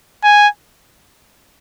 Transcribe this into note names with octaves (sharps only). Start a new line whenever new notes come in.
G#5